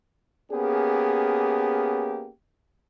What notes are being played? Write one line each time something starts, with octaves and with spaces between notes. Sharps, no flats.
A#3 B3 C#4 G4 G#4